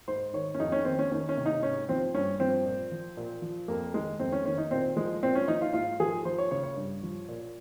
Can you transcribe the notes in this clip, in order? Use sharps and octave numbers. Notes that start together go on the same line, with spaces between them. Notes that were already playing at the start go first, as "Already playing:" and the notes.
G#2 C5
D#3 C#5
C#4
F2 D#4
C#4
D#3 C4
C#4
D#3 C#4
C#4
C3
D#4
G#2 C#4
F3 C4
G2 C#4
F3 C4
A#2
F3
A#2
F3
F2 A#3
D#3 G#3
F2 C4
C#4
D#3 C#4
D#4
A#2 C4
F3 G#3
A#2 C4
C#4
F3 D#4
F4
G#2 F4
F3 G#4
F3 C5
C#5
C#3 C#5
C#5
G2
F3
A#2